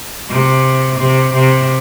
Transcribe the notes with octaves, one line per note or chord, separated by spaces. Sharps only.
C3
C3
C3